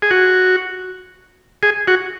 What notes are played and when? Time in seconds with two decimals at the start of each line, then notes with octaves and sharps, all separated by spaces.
0.02 G#4
0.11 F#4
1.63 G#4
1.88 F#4